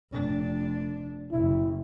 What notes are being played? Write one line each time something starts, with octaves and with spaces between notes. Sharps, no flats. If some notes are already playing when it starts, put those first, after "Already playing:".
F1 D4
F#1 E4